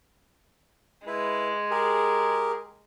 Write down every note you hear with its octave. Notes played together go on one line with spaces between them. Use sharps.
G#3 E4 B4
G4 G#4 A#4